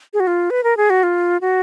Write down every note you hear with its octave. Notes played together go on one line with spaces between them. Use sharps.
G#4
F#4
F4
B4
A#4
G#4
F#4
F4
F#4